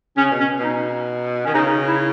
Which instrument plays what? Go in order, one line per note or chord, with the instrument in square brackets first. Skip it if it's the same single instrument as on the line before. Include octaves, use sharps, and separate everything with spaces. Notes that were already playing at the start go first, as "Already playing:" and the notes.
[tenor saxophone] C#3 [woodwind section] C#4
[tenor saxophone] B2
[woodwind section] C#4
[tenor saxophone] B2 [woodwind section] D#4
[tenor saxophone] D#3 [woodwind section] C#4
[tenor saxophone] C#3 [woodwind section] D#4
[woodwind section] E4